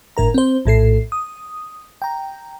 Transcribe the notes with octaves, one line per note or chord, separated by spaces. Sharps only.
G1 A2 A#4 A#5
C4 C5
A#1 A2 A4 C7
D#6
G5 A#5